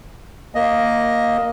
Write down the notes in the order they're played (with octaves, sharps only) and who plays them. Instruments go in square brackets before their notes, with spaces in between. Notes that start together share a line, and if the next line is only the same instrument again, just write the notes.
[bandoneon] A#3 D#5